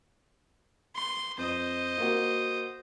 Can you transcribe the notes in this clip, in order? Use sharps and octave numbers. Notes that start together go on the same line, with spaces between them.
C6
F2 C5 D#5
A#3 F#4